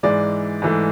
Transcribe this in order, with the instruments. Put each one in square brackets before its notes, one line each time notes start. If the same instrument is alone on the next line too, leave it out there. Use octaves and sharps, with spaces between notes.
[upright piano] G#2 E3 G#3 D5
G#2 E3 A3